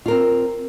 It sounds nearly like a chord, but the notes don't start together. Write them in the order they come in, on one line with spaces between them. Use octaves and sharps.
F4 A#4 C4